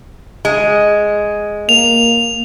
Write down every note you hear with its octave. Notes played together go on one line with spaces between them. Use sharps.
G#3
A#3 F7